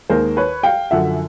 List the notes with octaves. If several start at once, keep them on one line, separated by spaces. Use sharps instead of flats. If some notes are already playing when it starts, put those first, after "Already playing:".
D#2 D#3 G#3 A#4 C5
B4 C#5
F5 G5
F#2 D3 F3 E5 F#5